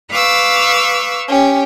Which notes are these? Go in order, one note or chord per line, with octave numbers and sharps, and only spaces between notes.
B4 F5 C#6 D6 E6
C#4 G4